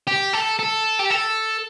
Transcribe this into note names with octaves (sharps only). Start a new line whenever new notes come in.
G4
A4
A4
G4
A4